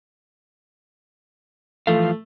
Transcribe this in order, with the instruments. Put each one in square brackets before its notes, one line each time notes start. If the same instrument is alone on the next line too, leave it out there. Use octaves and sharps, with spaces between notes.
[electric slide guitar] E3 F3 F5 [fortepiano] A3